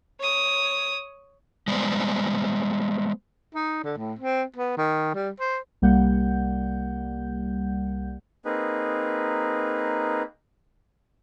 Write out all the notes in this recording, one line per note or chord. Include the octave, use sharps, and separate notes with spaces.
C#5 D#6
G3 G#3 B3 C5 D5
D#4
D3
A2
C4
B3
D#3
G3
C5
C2 G3 A#3 F#5 G6
A#3 C4 D#4 G#4 B4